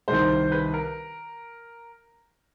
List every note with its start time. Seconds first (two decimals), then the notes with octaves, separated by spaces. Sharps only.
0.08 C2 C3 D#3 C5
0.52 B4
0.74 A#4